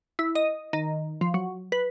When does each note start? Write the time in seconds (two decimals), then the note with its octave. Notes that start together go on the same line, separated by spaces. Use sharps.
0.19 E4
0.35 D#5
0.73 D#3
1.21 F3
1.34 F#3
1.72 B4